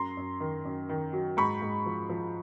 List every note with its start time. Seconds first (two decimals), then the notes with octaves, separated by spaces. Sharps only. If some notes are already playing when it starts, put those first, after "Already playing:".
Already playing: F#2 A#5 C6
0.17 F#2
0.40 D#3
0.65 F#2
0.89 D#3
1.13 F#3
1.37 G#2 B5 C#6
1.62 G#2
1.86 F3
2.09 F3